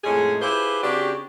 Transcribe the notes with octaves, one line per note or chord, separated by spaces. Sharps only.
F2 A2 G#3 C#4 G#4
E4 F4 G4 G#4 B4 C5
C#3 C4 D4 F#4 G4